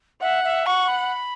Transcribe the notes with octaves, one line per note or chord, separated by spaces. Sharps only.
E5 F#5
E5
F#5 C#6
B5